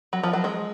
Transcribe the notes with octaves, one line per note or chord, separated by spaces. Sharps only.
F#3
F3
F#3
G#3